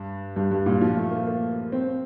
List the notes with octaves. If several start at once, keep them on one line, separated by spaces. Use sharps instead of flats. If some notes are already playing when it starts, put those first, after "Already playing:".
Already playing: G2
G2
G2
A#2
F3
A3
A#3
A#3
C4